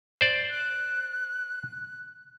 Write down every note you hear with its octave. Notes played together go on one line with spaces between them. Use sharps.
C5 D5
F#6